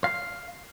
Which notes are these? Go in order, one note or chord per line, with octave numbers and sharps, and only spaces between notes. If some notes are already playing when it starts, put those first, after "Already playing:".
F5